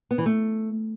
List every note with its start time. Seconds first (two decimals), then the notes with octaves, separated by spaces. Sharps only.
0.11 B3
0.18 E3
0.26 A3